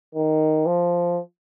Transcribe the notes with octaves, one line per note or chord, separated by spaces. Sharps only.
D#3
F3